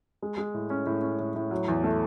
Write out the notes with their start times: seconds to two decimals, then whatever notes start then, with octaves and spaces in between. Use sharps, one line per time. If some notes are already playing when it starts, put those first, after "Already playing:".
0.22 G#3
0.38 G#3
0.54 A2
0.70 C#4
0.86 A2
1.03 C#4
1.19 A2
1.35 A2
1.51 F#3
1.68 E2
1.84 A3